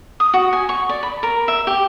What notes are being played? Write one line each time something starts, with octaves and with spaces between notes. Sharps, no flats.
D#6
F#4
G#5
C#6
D5
B5
A#4
E5
G4